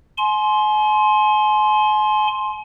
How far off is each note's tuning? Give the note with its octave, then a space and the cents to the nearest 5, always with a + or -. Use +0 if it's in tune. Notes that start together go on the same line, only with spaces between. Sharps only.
G#5 +40 C6 +5